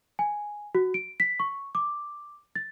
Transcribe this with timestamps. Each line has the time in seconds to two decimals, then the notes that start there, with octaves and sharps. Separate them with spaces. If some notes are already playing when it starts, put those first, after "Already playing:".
0.19 G#5
0.75 F#4
0.94 D7
1.20 B6
1.40 C#6
1.75 D6
2.55 A6